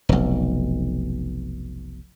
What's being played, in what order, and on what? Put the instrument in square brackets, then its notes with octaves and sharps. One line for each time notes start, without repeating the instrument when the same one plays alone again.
[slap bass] F1 B1